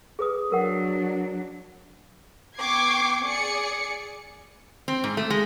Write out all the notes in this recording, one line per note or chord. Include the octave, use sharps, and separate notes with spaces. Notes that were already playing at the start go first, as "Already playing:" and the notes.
G#4 B4 D#6
F#3 D4 A#4 F#5
B3 G5 C#6 D6 G#6 C7
G#4 D5 D6 C#7
C4
G#2
A3
G#3